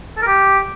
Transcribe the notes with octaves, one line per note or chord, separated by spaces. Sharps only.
A4
A#4
G4